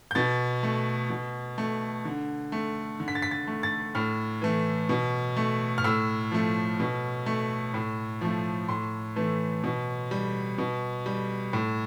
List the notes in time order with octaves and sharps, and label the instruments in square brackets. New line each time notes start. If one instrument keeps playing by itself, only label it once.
[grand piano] G6
B2 A6
A3
B2
A3
D3
A3
D3
B6
A6
B6
A6
A3
A6
A2 F6
E3 A3
B2
A3
F6
A2 E6
F3 A3
B2
A3
A2
F3 A3
A2 C6
E3 A3
B2
G3
B2
G3
A2